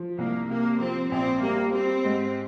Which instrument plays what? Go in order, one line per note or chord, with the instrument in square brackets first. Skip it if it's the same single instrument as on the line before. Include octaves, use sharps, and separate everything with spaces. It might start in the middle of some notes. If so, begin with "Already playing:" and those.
Already playing: [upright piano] F3
[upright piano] C2 [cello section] A#3
[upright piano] C3 [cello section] A#3
[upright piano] F3 [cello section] C4
[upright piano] A#1 [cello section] C4
[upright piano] G3 [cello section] A#3
[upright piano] G3 [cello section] C4
[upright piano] G#2